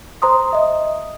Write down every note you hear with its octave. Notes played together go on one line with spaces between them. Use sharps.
C5 A#5 C6 D#6
D#5 E5 D#6